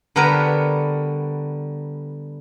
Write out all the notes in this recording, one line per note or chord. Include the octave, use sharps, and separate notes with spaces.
D3 G3 B3 A#4 B4 C#5